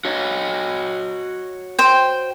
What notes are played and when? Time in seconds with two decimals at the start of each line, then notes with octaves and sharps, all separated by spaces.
0.05 F#4 C#5 D#5
1.79 C5 G5